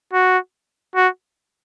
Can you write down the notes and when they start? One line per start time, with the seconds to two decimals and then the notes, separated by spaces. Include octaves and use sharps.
0.13 F#4
0.95 F#4